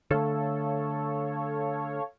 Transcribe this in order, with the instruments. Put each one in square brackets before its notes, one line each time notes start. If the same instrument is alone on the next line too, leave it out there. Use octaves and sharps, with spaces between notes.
[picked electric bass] D3 A3 [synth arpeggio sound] A4 C#5 F5